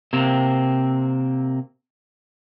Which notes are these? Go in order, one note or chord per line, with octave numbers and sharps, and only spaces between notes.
C3 A#3 C4